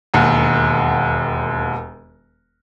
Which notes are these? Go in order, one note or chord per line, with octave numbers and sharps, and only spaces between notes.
E1 D#2 F#5